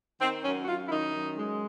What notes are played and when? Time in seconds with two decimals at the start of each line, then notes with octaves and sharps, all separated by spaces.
0.22 D#3 C4
0.45 F#2 C#4
0.63 F#4
0.68 F#2 F4
0.87 E4
0.92 D#3 D#4
1.14 F#2
1.38 G#3